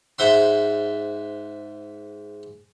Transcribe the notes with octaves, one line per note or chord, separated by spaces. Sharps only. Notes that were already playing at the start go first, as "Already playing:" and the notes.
G#2 C5 E5 F#5 C6